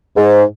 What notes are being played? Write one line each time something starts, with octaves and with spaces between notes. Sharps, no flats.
G#2